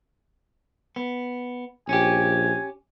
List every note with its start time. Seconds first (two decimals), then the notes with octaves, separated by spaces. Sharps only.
0.96 B3
1.89 A#1 C#4 G4 G#5